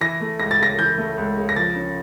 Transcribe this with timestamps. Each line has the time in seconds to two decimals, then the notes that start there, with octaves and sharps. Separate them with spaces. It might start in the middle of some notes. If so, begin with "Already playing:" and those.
0.01 E3 A#6
0.20 A3
0.40 C#2 A#6
0.51 A6
0.59 C#3 A#6
0.78 E3 G6
0.98 A3
1.18 C#2
1.37 C#3
1.49 A#6
1.56 F3 A6
1.76 C#4